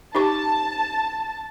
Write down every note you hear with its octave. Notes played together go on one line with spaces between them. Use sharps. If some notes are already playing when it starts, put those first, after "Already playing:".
D#4 G4 A5 C#6